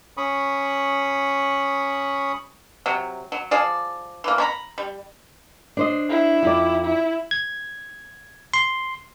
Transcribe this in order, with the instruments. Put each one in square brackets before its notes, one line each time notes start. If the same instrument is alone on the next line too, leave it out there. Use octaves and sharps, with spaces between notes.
[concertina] C#4 B5 C#6 D#6
[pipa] C3 F#3
F#3
F3 G#4 D5
E3 A#3
C#4 A#5 B5
G3
[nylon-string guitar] D4 C5 D#5
[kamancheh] E4
[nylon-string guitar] F2 D#4 D5
[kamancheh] E4
[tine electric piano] G#6
C6